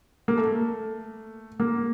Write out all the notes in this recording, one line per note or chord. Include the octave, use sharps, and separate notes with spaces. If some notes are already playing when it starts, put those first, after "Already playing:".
A#3
A3
A#3